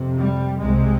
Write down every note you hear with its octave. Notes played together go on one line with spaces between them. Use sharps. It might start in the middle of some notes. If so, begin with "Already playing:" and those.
Already playing: F2 C3
G3
C2 C3 G#3